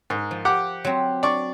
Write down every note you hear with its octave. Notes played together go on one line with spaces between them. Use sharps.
G#2 A#4
F3
G4 F#5 D6
F#3 C4
D4 D5 C#6